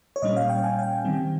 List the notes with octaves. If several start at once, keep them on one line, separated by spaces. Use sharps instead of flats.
C#5
A#2 G3 C#4 D#5
F5
G5
G#5
F5
G5
D#3 G3 C4